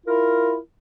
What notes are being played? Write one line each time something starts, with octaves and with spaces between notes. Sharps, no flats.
E4 F4 A#4